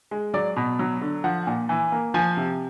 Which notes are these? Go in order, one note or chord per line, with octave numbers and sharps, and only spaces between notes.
G#3
F#3 D5
B2
F#3
D3
F3 F#5
A#2
E3
A#3
F3 G#5
C3